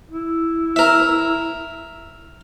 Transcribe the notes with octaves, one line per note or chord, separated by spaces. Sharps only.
E4
A#4 E5